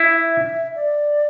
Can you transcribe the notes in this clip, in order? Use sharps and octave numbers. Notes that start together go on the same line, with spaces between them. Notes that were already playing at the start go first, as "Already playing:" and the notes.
Already playing: E4 E5
D5